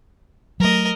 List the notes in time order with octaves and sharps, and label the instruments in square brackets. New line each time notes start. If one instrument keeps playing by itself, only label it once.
[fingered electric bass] F#3 A3 [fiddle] A#4 D#5